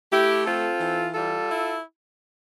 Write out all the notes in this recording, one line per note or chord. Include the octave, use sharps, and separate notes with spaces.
A3 E4 G4
C4 F4 A4
E3
G3 F4 A4
E4